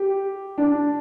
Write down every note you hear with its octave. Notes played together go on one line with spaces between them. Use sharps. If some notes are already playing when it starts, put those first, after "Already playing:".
Already playing: G4
D4